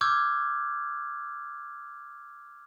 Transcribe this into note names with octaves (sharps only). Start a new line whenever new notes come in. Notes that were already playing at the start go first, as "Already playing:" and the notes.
C#6 D6 E6 F6 G6 G#6